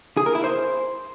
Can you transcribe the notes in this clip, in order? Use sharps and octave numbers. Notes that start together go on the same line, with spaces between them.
G#4
A#4
E4
C5